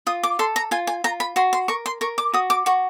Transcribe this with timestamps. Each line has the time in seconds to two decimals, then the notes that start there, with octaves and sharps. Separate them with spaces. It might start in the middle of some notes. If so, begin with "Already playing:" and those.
0.07 F4 D#6
0.23 D6
0.39 A4 C6
0.56 A#5
0.71 F4 G#5
0.87 G#5
1.04 F4 A#5
1.20 B5
1.36 F#4 C6
1.53 C6
1.68 A#4 C#6
1.86 C6
2.01 A#4 C#6
2.18 D6
2.33 F#4 D#6
2.50 D6
2.66 F#4 C#6